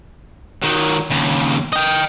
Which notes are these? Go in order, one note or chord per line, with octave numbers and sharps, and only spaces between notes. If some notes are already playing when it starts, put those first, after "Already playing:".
D#3 F#3
D#2 C#3
D#5 G5